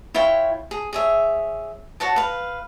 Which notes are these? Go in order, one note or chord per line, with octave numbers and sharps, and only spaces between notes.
E4 F4 C#5 G5
G#4
G#4 C#5 E5
F#4 C#5 F#5 A5
B4 F5